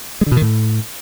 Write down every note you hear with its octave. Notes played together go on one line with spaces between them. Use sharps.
G#3
D3
B2
D#3
A2